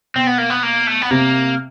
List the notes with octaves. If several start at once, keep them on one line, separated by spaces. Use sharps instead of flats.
B2 C4
B3
A#3
B3
A#3
A3
B3
C3 A#3